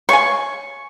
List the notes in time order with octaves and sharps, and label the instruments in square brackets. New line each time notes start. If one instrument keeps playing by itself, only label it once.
[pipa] C#5 F5 G#5 [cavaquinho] C#6